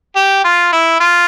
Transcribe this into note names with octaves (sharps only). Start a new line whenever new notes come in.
G4
F4
E4
F4